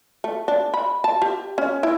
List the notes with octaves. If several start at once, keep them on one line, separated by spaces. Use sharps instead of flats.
A3
D4
B5
A5
G4
C#4
E4